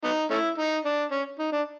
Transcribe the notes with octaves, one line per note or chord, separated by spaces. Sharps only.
B3 D#4
A3 C#4 E4
D#4
D4
C#4
D#4
D4